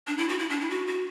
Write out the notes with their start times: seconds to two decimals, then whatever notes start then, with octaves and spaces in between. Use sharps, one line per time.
0.08 D4
0.18 E4
0.29 F#4
0.39 E4
0.50 D4
0.61 E4
0.70 F#4
0.87 F#4